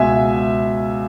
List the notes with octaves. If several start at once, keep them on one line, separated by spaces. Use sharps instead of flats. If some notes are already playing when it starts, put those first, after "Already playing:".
Already playing: C#2 B2 E5 G#5